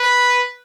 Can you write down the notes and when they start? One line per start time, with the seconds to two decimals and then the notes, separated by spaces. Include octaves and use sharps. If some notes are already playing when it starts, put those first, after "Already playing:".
Already playing: B4